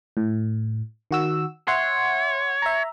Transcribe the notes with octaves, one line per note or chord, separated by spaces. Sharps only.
A2
D#3 F#4 E6
C#5 E5 F#5 C6
E5 A#5